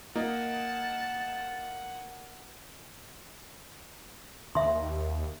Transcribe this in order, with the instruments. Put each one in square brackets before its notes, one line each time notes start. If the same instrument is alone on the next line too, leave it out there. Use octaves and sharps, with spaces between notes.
[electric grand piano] A#3 [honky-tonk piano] D#4 [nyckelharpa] F#5 [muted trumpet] A5
[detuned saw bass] D#2 [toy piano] E5 C6